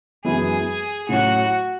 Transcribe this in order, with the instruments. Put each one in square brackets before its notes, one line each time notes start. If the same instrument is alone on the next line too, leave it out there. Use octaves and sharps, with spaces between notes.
[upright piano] F#2 E3 G#3 B3 E4 [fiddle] G#4
[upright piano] A2 F#3 C#4 [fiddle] F#4